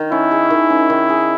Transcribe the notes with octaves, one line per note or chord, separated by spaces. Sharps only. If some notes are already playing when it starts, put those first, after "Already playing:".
Already playing: D#3
C#4 E4
G#4
D#3
C#4
D#3
G#4